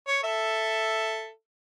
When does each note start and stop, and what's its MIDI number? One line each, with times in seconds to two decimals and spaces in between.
0.07 0.21 73
0.24 1.29 69
0.24 1.29 76